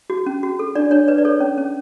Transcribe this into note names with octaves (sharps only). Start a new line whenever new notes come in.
F#4
C#4
F#4
A4
D4 D5
D4 C#5
B4 D5
D5
A4 C#5
C#4
C#4